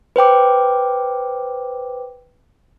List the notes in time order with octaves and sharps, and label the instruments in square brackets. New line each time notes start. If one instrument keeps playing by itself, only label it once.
[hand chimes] B4 C5 G5 D6